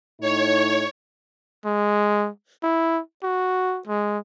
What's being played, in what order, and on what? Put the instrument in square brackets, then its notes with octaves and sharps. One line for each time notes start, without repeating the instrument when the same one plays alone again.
[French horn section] A2 D#4 [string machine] C#5
[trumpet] G#3
E4
F#4
G#3